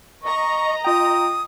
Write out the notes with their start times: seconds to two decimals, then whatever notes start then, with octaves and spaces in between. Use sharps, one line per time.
0.23 D#5 A#5 C#6
0.85 F4 G5 D#6